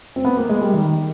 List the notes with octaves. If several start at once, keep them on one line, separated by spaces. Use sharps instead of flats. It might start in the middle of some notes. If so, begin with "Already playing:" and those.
C4
B3
A#3
G#3
G3
D#3